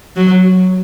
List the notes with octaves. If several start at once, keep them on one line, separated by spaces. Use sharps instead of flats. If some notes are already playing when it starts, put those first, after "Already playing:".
F#3